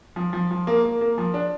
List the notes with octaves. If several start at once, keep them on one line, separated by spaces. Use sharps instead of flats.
F3
F3
F3
A#3
A#3
A#3
F3
D4